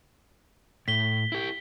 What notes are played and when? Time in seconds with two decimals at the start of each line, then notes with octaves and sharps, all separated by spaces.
0.88 A2 B6 G7
1.32 E4 G4